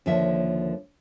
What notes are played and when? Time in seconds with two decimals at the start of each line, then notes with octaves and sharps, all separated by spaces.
0.06 D#2 D3 F3 A#3 C#5 E5